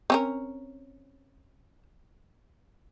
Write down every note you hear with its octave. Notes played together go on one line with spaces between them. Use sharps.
C4 C#4 A#4